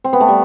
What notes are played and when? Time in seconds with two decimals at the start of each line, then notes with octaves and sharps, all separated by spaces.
0.04 C4
0.13 B3
0.20 A3
0.28 G3